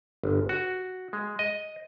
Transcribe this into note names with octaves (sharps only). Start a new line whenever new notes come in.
G1
F#4
G#3
D#5